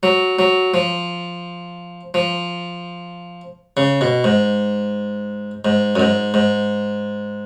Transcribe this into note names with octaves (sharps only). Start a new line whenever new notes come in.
F#3
F#3
F3
F3
C#3
B2
G#2
G#2
F#2
G#2
G#2